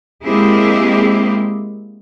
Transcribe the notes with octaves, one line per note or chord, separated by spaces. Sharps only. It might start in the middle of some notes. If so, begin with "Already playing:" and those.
G#3 A#3 C4 E4 G4 G#4